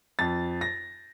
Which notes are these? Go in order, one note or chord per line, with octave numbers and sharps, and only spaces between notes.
F2 A6
A#6